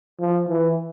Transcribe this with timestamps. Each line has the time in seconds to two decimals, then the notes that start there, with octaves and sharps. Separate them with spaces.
0.20 F3
0.49 E3